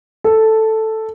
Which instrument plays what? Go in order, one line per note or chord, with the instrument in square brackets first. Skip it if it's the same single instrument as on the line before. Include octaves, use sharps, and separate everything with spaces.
[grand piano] A4